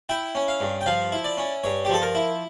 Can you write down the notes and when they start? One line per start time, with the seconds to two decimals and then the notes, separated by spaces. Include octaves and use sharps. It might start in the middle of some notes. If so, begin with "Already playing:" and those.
0.09 E4 G5
0.35 C#4
0.48 F5
0.60 G2
0.81 G5
0.86 F3 F5
1.12 E4
1.24 D5
1.38 C#4
1.64 G2 C#5
1.85 G4
1.89 F3 A4
2.02 A#4
2.15 E4